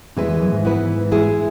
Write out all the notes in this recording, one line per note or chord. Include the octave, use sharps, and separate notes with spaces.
E2 E3 G#3 E4 B4
E2
F#2
G#2
E3 B3 E4 B4
G#3 E4 G#4